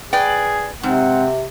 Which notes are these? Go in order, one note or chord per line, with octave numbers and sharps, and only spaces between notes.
G#4 B4 D5 G5
G#2 C3 C4 F#5